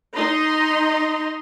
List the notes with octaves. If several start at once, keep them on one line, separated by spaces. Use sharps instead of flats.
D#4 D#5 A#5 C6